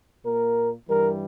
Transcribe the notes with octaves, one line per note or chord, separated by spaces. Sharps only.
A#2 A#3 A#4
G2 E3 G3 A#4